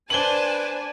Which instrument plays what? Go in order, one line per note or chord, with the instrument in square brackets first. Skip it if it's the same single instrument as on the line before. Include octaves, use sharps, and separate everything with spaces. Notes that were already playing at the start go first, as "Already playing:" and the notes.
[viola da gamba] D4 [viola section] B4 D5 G#5 [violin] C5 A5 [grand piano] F#7 G7